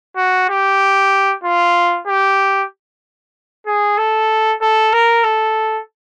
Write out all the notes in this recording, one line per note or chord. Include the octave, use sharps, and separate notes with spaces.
F#4
G4
F4
G4
G#4
A4
A4
A#4
A4